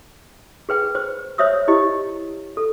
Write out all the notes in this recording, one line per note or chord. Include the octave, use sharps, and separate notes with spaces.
G#4 B4 G5
C5
C5 C#5 E5 D#6 E6
E4 G4 D#5
A4